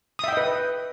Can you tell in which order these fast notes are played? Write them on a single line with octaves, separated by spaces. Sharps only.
D#6 E5 G5 D#5 B4